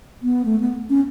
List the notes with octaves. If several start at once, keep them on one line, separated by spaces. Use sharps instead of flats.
B3
A3
B3
C#4